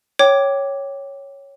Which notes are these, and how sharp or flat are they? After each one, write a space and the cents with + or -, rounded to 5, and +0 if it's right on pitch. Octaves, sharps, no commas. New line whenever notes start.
C#5 +0 G5 -10 D6 +0